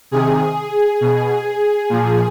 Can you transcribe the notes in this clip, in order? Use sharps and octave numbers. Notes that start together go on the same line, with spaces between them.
C3 D#3 G#4
B2
A#2 F3